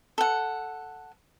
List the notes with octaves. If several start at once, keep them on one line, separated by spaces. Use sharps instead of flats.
A4 F#5